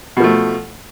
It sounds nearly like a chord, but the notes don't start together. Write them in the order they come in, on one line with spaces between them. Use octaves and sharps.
B2 F3 A3